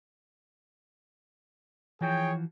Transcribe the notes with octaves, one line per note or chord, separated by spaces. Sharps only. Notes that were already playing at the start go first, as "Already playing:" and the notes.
E3 F3 F#4 G#4 C#5 G5